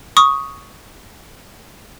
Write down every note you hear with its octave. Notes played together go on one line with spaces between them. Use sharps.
C#6 D#6